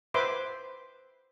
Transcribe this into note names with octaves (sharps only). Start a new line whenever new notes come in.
B4 C5 E5 C6 D6